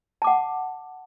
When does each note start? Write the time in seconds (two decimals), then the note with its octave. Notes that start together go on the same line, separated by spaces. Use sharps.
0.22 A5
0.24 D6
0.27 F#5